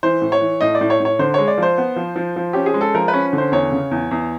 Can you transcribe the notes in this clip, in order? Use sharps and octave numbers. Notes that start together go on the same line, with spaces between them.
E3 C5
A2
C#5
E3
A2 D#5
D5
A2
C#5
A2
C#5
D3 C5
G#3 C#5
D5
F3 C5
B3
F3
F3
F3
C#4 G4
G#4
G#3
A4
F3 A#4
B4
C#4
D3
C5
E2 C#5
C#3
E2
E2